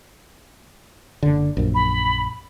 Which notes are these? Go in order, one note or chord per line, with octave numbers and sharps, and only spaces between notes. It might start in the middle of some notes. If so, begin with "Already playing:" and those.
F#1 D3
A#1 F#2
B5